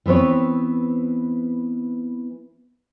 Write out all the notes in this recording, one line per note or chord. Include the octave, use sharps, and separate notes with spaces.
E3 B3 C4 B4 C#5